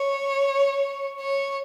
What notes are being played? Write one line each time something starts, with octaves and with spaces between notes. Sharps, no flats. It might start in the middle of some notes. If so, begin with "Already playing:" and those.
Already playing: C#5
C#5